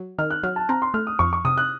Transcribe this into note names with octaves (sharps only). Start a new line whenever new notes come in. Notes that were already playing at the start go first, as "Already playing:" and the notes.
Already playing: F#3
D#3 F6
F#6
F#3 F6
A5
C4 A#5
C6
A3 F6
D#6
F2 C#6
C#6
C3 D#6
F#6